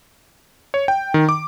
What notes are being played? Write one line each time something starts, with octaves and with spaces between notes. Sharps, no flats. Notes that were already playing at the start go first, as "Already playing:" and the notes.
C#5
G5
D#3
D6